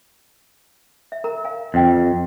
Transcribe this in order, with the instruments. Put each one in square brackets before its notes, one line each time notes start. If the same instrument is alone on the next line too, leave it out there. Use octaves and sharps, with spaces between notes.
[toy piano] E5
A#4 A#5
F5 G#5
[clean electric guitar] F2 [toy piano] D#5 G5